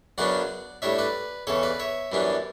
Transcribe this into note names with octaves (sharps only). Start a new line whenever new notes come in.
F#2 C#3 F#3 B3 D4 D5 F#5
A2 G3 D4 C#5 E5
B4 D5
E2 C#3 E3 A4 C#5
B4 D5
C#5 E5
F#2 E3 G3 B3 D4